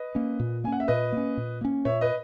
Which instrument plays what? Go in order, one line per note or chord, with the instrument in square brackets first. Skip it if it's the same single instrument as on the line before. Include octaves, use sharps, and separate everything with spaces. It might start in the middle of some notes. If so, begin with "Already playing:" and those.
Already playing: [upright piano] B4 D#5
[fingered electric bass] A#3 C#4
A#2
[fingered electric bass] A#3 C#4 [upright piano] G#5
[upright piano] F#5
E5
[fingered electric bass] A#2 [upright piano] B4 D#5
[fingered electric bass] A#3 C#4
A#2
A#3 C#4
[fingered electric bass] A#2 [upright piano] C#5 E5
[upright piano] B4 D#5